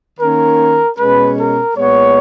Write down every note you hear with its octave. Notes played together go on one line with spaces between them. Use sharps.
D#3 A#3 C#4 A#4
B2 G#3 C#4 B4
A#4
A#2 G#3 B3 C#5